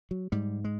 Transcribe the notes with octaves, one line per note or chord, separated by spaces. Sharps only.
F#3
G#2 G3
G#3